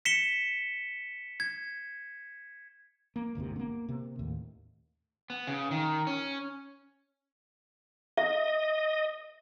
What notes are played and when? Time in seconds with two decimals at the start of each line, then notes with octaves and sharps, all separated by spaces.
0.05 B6 C#7 E7 G7
1.40 G#6
3.16 A#3
3.35 G1 D2 G#2 C3
3.56 A#3 B3 C#4
3.88 C3 A#3
4.19 D#2 A2
5.30 B3
5.47 C#3
5.71 D#3
6.07 C#4
8.18 D#5 E5